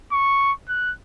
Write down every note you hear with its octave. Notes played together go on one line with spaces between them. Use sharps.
C#6
F#6